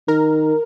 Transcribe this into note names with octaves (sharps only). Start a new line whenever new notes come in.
D#3 A#4